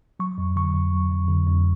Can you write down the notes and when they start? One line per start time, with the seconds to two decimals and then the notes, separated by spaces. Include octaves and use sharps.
0.19 F#3 C#6
0.38 F2
0.56 D3 C#6
0.74 F2
0.93 F#3
1.11 F2
1.29 D3
1.47 F2